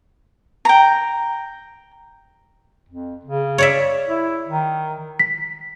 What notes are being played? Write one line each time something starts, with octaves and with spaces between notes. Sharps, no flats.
G5 A#5
F2
C#3
C#5 D5 E5
E4
D#3
B6